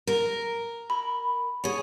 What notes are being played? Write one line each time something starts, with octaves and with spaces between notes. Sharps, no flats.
A#4
B5
G#4 C#5